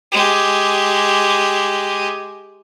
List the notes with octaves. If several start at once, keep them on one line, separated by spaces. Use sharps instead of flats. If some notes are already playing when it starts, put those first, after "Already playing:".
G#3 G4